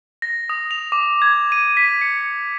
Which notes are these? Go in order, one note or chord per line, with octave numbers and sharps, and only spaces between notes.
A#6
D#6
F7
D6
G#6
D#7
B6
C#7